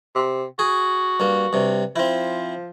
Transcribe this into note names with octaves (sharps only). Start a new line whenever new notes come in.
C3
F#4 G#4
G2 A#3
G2 C3
F3 C4 E4